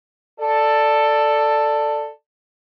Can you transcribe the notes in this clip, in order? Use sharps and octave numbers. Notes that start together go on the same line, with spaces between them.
A4 D5